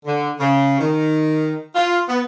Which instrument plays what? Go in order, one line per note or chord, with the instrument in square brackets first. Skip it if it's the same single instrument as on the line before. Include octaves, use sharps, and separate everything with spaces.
[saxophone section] D3
C#3
D#3
F4
B3